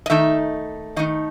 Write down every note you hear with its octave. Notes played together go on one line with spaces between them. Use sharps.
D#5
D#3 A3 D#4 E5
D#3 A3 D#4 D#5